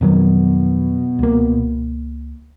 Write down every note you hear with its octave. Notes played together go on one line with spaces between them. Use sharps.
F2 B2 D#3 F#3
C#2 A#3